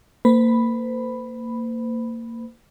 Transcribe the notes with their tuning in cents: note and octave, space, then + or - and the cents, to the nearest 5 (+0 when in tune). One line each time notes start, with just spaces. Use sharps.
A#3 -20 C5 -40 B5 +0